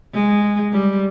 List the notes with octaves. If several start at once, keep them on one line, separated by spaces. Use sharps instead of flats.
G#3
G3